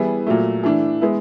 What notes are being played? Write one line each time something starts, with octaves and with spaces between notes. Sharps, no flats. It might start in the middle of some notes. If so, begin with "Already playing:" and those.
Already playing: E3 G3 B3 E4 G#4
A#2 F#3 A3
E3 A3 D4
G#3 B3 E4